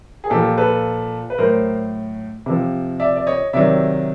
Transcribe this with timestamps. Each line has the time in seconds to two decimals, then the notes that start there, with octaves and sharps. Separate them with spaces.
0.24 G#4
0.30 A#2 F3 G4 A4
0.58 A4 B4
1.30 B4
1.38 A2 F#3 A#4 C5
2.46 C3 F3
3.00 D5 E5
3.16 D5
3.27 C#5 D#5
3.53 C3 D#3 F#3 D5 E5